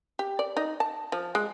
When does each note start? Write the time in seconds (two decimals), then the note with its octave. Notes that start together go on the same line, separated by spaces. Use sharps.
0.19 G4
0.39 D5
0.57 D#4
0.80 A5
1.12 F3
1.35 G#3